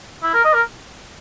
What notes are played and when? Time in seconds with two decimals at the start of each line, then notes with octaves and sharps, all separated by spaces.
0.23 E4
0.34 A#4
0.44 D#5
0.54 A#4